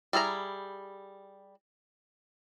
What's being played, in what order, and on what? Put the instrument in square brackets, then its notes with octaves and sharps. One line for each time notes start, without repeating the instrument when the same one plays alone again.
[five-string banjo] G3 E4 G#4 A#5